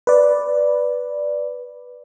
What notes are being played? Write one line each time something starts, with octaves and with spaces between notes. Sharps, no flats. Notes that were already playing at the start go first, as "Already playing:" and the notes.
B4 D5